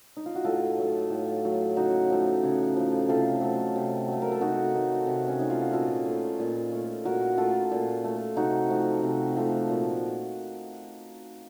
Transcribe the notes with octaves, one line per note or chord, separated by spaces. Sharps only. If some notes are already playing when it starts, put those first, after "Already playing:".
D#4
F4
F#4
A2 F4 A4
F#3 A3
A2
F#3 A3
C#3 D#4 F#4
F3 A3
C#3
F3 A3
C3 F4 A4
F#3 A3
C3
F#3 A3
A#4
A4
C3 D#4 F#4
D#3 A3
C3
C#4
D#3 A3 D#4
F4
F#4
A#2 F4 A4
A3
A#2
A3
A#2 F#4 A#4
A3 F4 A4
A#2
A3
C3 D#4 F#4
F3 A3
C3
F3 A3
A#2